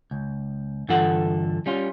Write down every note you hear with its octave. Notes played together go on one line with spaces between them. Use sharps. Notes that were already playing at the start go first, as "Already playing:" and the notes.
C#2
G2 D3 E3 F4 A4 F#5
G3 C#4 F4